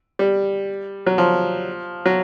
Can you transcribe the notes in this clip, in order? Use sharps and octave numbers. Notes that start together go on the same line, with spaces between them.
G3
F#3
F3
F#3